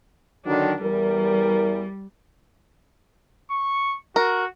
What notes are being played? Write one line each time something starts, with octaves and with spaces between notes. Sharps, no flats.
D3 D#3 F#3 D4
E2 E3 G3 A#4
C#6
F#4 A#4